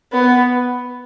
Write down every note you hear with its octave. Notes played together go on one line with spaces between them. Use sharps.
B3